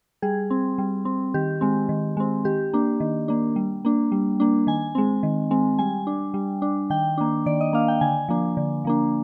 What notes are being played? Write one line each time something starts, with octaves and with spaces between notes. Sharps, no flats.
G3 G#4
C4
G3
C4
D#3 G4
G#3 C4
D#3
G#3 C4
D#3 G4
A#3 D4
D#3
A#3 D4
G3
A#3 D4
G3
A#3 D4
D#3 G#5
G#3 C4
D#3
G#3 C4
G3 G#5
D4
G3
D4
D#3 G5
A#3 D4
D#3 D5
D#5
A#3 D4 F5
G5
D3 G#5
F3 A#3 D4
D3
F3 A#3 D4